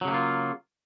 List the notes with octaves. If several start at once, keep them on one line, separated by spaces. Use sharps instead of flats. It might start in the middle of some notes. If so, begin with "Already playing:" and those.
C#3 F#3 A3 A#3 F4